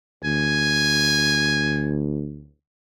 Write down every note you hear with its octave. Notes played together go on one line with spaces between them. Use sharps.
D2 G#5